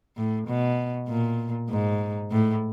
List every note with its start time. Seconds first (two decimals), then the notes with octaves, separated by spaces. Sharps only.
0.17 A2
0.48 B2
1.08 A#2
1.70 G#2
2.31 A2